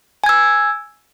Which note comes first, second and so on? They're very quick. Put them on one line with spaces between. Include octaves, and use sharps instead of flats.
G#5 G#6 E6